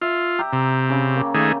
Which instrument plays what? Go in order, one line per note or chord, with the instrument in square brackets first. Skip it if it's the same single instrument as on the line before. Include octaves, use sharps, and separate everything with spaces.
[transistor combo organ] F4 [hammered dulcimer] E5
[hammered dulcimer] G4 A#5
[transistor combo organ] C3
[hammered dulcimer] C#3 D6
A#3
[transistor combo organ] D#3 A3 G#4